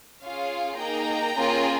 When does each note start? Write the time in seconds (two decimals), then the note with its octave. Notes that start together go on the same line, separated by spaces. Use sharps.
0.24 C#4 F4 G#4 C#5 F5
0.79 A#3 D#4 G#4 G5 A#5
1.35 A#3 C#4 F4 G#4